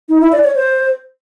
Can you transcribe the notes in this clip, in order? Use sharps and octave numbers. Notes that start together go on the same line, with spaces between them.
D#4
E4
D5
C#5
C5